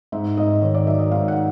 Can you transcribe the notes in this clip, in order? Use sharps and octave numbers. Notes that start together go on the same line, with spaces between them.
G#2 E5
G#2 D#5
D#3 C#5
D5
F#3 E5
D#5
G#2 F5
F#5